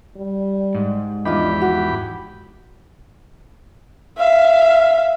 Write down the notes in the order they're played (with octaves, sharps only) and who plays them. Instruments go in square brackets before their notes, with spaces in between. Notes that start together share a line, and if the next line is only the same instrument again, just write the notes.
[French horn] G3
[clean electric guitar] G#2
[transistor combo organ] E2 G4 B5 [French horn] F3 [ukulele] D4 D#4 F4
[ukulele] F#4
[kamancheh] E5 F5